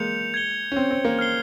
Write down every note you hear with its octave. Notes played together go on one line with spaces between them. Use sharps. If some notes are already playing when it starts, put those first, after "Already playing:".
Already playing: G#3 A#3 G6 C#7 F7
G#6 C#7 G7
C#4
C4
C4
A#3
F6 C7 G7